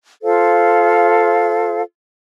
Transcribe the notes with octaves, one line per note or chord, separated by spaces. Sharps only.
F4 A4 C5 F5